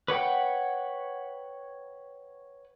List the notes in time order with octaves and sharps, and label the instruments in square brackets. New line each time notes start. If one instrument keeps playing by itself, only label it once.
[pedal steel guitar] B4 C#5 F#5 G5